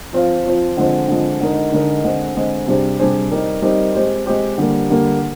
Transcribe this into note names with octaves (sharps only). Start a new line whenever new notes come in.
F3 C4 F4
F3 C4 F4
D3 F3 G#3 C4
D3 F3 G#3 C4
D3 G#3 D#4 A#4
D3 G#3 D#4 A#4
D3 G#3 C4
D3 G#3 C4
C3 G3 D4 G#4 C5
C3 G3 D4 G#4 C5
G3 C4 D#4 G4 A#4
G3 C4 D#4 G4 A#4
G#3 C4 G4 C5
G#3 C4 G4 C5
D3 G3 A#3
D3 G3 A#3